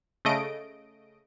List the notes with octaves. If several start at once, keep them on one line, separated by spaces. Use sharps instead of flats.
C#3 A3 D#5 D7